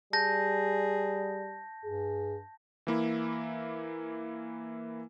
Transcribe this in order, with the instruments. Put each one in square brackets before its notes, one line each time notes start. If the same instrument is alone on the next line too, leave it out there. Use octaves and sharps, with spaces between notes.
[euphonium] G3 [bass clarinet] G#4 [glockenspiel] A5 G6 A#6
[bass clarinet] G2 [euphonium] G#4
[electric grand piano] E3 A#3 E4